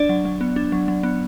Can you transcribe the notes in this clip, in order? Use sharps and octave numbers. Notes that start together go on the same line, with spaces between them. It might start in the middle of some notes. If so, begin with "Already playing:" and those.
Already playing: D4 D5
F#3
F#3
B3
D4
F#3
F#3
B3